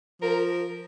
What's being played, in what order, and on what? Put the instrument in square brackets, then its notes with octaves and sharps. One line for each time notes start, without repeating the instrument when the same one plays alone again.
[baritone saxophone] F3 [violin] A#4